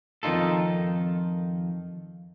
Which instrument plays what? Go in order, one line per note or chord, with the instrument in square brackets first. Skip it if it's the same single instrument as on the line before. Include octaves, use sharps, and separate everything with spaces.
[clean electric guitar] F2 D#3 A3 D#4 F4 A4